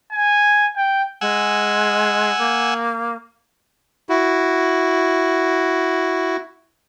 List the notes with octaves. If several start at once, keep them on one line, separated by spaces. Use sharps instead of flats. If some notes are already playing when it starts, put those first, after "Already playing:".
G#5
G5
G#3 F#5 G#5 E6
A#3
E4 F#4